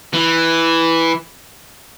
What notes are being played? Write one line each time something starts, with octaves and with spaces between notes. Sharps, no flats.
E3